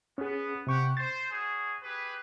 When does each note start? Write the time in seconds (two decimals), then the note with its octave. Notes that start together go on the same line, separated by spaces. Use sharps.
0.18 B3 C#4 G#4
0.67 C3 G4 F#5 G5 C#6
0.97 C5 A6
1.31 C#4 F#4 G#4
1.82 G4 G#4 B4